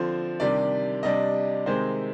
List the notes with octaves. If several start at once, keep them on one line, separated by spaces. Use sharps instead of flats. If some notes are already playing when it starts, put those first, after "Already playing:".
Already playing: D3 F3 C4 C5
C3 D#3 G3 D4 D5
C3 G3 D4 D#5
C3 D#3 G#3 C4 C5